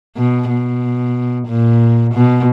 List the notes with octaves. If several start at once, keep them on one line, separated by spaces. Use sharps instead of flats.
B2
B2
A#2
B2